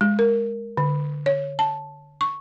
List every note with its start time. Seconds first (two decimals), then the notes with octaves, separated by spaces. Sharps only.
0.01 G#3
0.19 A#4
0.77 D3
1.26 C#5
1.59 A5
2.21 C#6